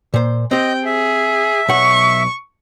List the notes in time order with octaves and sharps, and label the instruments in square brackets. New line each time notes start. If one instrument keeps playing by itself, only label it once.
[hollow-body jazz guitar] A#2 C5
[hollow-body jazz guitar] C4 G4 [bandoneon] D#5 [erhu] G5
[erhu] G#4 [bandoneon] E5
[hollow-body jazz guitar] B1 F#5 [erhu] C#6